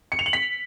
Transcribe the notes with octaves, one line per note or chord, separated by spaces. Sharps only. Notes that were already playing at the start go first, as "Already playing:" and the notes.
C#7
F7
F#7
B6